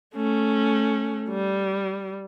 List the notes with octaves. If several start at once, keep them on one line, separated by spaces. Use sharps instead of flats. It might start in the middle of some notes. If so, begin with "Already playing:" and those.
A3 C#4
G3